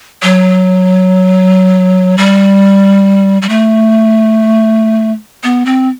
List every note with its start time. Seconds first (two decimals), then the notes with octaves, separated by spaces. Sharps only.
0.23 F#3
2.18 G3
3.42 G3
3.49 A3
5.43 B3
5.65 C4